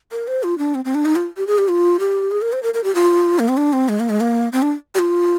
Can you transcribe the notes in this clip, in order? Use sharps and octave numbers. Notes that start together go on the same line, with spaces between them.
A#4
C5
F4
D4
C4
C4
D4
D#4
F4
G4
G#4
G4
F4
G4
G#4
A#4
C5
A#4
A#4
G4
F4
A#3
C4
D4
C4
G#3
A#3
G#3
A#3
C4
D4
G4
F4